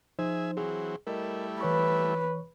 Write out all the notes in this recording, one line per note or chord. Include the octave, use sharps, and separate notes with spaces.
F3 D#4 G#4 C5 E5
E3 F#3 C4 G#4
G3 A3 E4 A#4 D#5
E3 B4 C#5 C#6